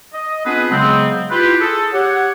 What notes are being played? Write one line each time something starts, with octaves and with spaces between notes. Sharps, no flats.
D#5
B3 C4 D4 F4 G#4 B4
C#3 F#3 G#3 B3 C4
E4 F4 G4 B4
G#4 A4
G4 C#5 F#5